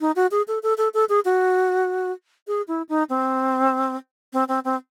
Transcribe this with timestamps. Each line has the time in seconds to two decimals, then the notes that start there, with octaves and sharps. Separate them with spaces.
0.01 D#4
0.16 F#4
0.31 G#4
0.48 A4
0.63 A4
0.78 A4
0.94 A4
1.09 G#4
1.25 F#4
2.47 G#4
2.68 E4
2.89 D#4
3.10 C4
4.33 C4
4.49 C4
4.65 C4